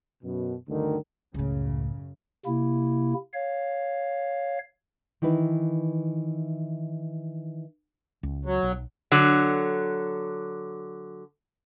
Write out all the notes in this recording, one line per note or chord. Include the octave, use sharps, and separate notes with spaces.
F#2 B2
D2 G2 D3 D#3
C#2 F#2 A2 C#3
C3 A#3 E4
C#5 F5
D#3 E3 D#4 E4 B4
C#2
F#3
B1
D3 F#3